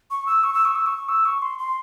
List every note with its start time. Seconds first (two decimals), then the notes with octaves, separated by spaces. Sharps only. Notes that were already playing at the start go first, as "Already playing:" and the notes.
0.10 C#6
0.26 E6
0.43 C#6
0.54 E6
0.65 C#6
0.75 E6
0.86 C#6
1.08 E6
1.25 C#6
1.42 C6
1.58 C6